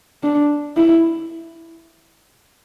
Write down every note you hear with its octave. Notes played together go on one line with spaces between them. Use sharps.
D4
E4